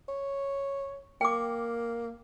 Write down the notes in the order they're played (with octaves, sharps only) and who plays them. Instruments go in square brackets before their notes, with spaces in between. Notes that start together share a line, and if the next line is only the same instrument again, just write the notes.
[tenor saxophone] C#5
[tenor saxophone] A#3 [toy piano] G5 D6